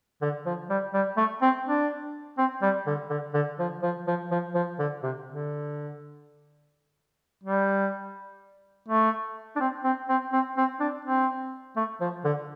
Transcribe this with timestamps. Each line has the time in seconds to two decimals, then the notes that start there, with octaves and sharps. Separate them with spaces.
0.22 D3
0.46 F3
0.70 G3
0.94 G3
1.17 A3
1.42 C4
1.66 D4
2.38 C4
2.62 G3
2.87 D3
3.10 D3
3.34 D3
3.59 F3
3.83 F3
4.07 F3
4.31 F3
4.55 F3
4.79 D3
5.03 C3
5.27 D3
7.43 G3
8.88 A3
9.56 D4
9.60 C4
9.84 C4
10.09 C4
10.33 C4
10.57 C4
10.80 D4
11.05 C4
11.76 A3
12.01 F3
12.25 D3